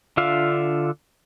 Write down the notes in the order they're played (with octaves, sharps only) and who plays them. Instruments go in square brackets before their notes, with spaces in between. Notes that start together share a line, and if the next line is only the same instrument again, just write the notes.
[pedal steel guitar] D3 D4 F4 E5 F5